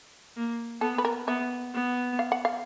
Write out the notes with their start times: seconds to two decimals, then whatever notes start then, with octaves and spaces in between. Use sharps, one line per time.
0.37 A#3
0.81 B3 A4
0.98 B4
1.05 A#4
1.27 B3 E5
1.74 B3
2.19 F5
2.32 F#5
2.45 F5